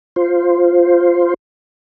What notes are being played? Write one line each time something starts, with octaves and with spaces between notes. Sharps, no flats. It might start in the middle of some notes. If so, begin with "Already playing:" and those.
F4 C5